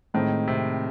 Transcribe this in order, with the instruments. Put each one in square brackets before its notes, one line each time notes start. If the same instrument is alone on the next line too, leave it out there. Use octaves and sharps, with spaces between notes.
[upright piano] A2 G#3 C4 [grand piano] D#3
[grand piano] C3